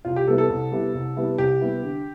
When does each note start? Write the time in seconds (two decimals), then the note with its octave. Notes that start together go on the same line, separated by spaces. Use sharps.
0.05 C2 F4
0.16 G4
0.28 C3 G3 B3 E4 A4
0.38 A4
0.50 C2
0.72 C3 G3 B3 E4
0.95 C2
1.17 C3 G3 B3 E4
1.38 C2 G4
1.61 C3 G3 B3 E4
1.83 D3